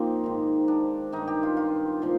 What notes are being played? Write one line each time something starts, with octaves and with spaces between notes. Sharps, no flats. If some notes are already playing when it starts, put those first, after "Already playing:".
Already playing: A#2 F3 A#3 C4 D#4 G4
G#2 D#3
D4
G2 D#3 D#4
G4
F4
F4
A#2 F3